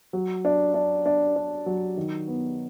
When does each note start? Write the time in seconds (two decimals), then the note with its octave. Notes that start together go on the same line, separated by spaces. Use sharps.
0.13 F#3
0.45 D4
0.74 D4
1.06 D4
1.36 D4
1.66 F#3
1.97 D#3
2.28 B3